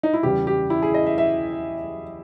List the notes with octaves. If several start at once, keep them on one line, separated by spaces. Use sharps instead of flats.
D#4
E4
E2 C#3 E3 G3 G4
G4
E4
G#4
D#5
E5
E5